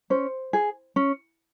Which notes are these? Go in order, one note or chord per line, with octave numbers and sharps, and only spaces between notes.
C#4 C5
G#4
C#4